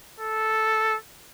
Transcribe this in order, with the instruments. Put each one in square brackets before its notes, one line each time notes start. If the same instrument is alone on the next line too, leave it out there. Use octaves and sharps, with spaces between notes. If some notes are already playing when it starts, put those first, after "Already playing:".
[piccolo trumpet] A4